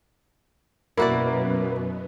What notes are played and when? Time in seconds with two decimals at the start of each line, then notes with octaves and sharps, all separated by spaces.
0.97 F#2 B2 A#3 B3 E4 F#4 D5